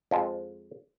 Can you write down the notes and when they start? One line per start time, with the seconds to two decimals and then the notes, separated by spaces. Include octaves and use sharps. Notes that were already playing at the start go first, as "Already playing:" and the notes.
0.11 F2 F3 G#3